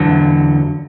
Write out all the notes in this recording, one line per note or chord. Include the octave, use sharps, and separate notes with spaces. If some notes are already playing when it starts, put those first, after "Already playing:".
Already playing: E2 D3 F#3